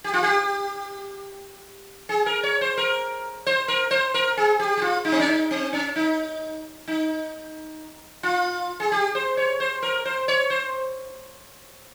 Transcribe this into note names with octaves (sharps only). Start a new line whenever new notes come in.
G4
F4
G4
G#4
A#4
C#5
C5
A#4
C5
A#4
C5
A#4
G#4
G4
G4
F4
D#4
C4
C#4
D#4
C4
C#4
D#4
D#4
F4
G#4
G4
C5
C#5
C5
A#4
C5
C#5
C5